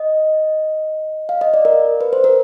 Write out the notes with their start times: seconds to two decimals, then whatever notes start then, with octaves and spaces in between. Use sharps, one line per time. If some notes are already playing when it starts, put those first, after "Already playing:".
Already playing: D#5
1.29 F5
1.41 D#5
1.54 D5
1.65 A#4
2.01 B4
2.13 C5
2.24 A#4